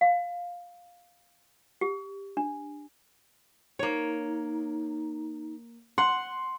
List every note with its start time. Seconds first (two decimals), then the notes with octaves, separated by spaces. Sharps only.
0.01 F5
1.81 G4
2.37 D4
3.79 A#3 D#4 C#5
5.98 F#5 C6